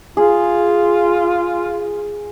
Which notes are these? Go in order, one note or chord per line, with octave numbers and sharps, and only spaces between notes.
F4 G#4